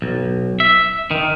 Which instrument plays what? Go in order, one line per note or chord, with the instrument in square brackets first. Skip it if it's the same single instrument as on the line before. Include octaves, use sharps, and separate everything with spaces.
[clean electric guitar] B1
E5
D#3